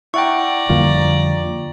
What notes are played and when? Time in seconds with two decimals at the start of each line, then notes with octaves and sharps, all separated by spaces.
0.14 E4 D5 E5 F#5 G5 A#5 C#6
0.69 F2 D3 F3 G3 A#3 F4